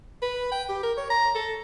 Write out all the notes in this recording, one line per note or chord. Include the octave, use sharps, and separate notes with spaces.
B4
G5
G4
A#4
C#5
A#5
A4